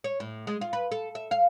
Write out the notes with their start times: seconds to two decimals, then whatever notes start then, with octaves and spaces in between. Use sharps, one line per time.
0.04 C#5
0.20 A2
0.47 G#3
0.61 F4
0.73 B4
0.91 A4
1.15 E5
1.31 F5